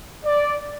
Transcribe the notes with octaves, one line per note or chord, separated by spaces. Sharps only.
D5